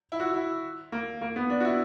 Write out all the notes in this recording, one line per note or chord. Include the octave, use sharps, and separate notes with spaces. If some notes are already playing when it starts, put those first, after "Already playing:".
E4
F#4
E4
A#3
A#3
B3
D4
F#4
E4